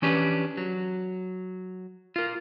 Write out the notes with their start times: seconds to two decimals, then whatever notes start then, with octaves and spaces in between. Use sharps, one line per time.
0.02 E3 C#4 D4 G4 B4
0.57 F#3
2.16 F4 A#4